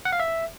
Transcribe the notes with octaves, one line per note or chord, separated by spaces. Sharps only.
F#5
F5
E5